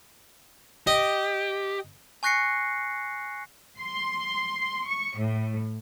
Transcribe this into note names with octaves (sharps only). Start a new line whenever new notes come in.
G4 D#5
G#5 C#6 F#6 A#6 C7 C#7
C6
C#6
A2